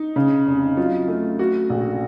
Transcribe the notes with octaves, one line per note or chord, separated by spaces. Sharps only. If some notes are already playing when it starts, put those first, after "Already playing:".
Already playing: D#4
C#3
F1
F#3 F4
A3
A3 F#4
A#1